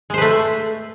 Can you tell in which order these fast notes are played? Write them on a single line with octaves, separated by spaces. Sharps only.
G#3 C5 B4 A3